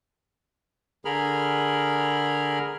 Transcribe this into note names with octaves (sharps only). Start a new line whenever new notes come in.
D3 G#4 A#4 B5 F6